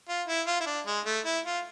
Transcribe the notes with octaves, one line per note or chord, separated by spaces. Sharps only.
F4
E4
F4
E4
D4
G#3
A3
E4
F4